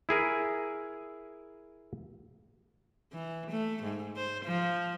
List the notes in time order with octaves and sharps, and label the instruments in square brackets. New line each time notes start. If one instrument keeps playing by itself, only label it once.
[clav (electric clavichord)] E4 G#4 A#4 G#5
[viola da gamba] E3
A3
G#2
C5
F3